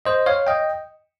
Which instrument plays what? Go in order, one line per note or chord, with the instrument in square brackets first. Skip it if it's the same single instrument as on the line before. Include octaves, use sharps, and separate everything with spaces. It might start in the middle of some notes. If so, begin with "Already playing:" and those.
[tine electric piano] C5 D#5
C#5 F5
D#5 G5